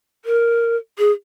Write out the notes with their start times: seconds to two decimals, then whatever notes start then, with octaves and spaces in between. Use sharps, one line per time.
0.25 A#4
0.99 G#4